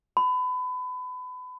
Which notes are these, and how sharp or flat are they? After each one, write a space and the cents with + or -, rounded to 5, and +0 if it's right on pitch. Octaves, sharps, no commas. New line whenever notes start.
B5 +30